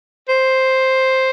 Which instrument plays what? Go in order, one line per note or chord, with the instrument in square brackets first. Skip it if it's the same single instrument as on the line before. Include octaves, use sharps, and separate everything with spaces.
[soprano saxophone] C5